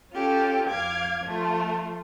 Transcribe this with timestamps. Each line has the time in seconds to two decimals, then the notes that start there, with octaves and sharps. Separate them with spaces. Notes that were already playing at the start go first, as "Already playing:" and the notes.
0.11 C#4 F4 G4 A4
0.67 F2 F5 D6 G#6
1.24 F3 A3 F4